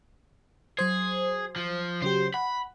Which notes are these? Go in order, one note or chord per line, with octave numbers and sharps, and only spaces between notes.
F#3 G#4 C5
F3
C#3 F#3 G4 C5
F#5 B5